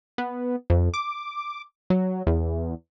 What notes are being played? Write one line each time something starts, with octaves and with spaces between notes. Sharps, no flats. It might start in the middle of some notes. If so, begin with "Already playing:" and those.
B3
F2
D6
F#3
E2